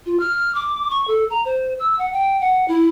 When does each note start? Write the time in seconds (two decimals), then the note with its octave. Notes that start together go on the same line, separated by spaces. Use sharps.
0.06 F4
0.20 F6
0.55 D6
0.90 C#6
1.08 A4
1.30 A#5
1.45 C5
1.80 E6
1.99 F#5
2.13 G5
2.41 F#5
2.68 E4